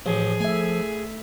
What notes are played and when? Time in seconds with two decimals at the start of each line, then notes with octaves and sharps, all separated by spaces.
0.06 A1 F3 G#4
0.40 A3 E5 G#5